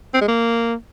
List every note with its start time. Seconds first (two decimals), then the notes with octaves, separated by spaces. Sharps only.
0.14 C4
0.21 G#3
0.28 A#3